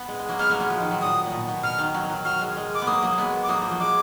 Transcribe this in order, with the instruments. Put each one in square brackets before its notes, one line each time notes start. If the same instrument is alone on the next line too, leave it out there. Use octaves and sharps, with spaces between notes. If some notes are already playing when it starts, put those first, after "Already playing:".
Already playing: [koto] B3
G#3
G#3
F#3 A#3
[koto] G#3 B3 [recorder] F6
[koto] F#3 A#3
G#3 B3
F3
D#3
F#3
[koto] A#2 [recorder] D#6
[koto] A#2
B2
B2
[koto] B2 [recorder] F6
[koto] D#3
F#3
F#3
[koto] F#3 [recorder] F6
[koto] G#3
G#3
[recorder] D6
[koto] B3
[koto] F#3 A#3 [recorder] D#6
[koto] F#3 A#3
G#3 B3
[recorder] D6
[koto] F#3 A#3 [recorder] D#6
[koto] F3
F#3
[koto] G#3 [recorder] D6